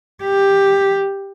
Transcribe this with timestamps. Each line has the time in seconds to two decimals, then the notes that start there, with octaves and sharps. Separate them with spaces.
0.24 G4